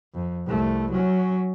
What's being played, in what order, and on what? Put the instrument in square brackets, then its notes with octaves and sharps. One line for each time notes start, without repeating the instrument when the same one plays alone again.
[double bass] F2
C2 A3
F#3 C#4